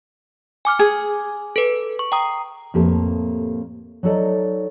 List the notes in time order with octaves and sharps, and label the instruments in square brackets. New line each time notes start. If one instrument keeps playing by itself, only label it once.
[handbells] G#5 D6 F6
[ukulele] G#4
[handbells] A4 B4
C#6
G5 A#5 D#6
[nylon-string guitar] F2 A2 A#3 G4 A4 B4
F#3 D#4 A4 D5 D#5